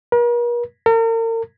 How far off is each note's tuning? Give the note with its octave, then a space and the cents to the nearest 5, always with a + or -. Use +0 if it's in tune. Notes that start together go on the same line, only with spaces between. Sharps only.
A#4 +45
A#4 -40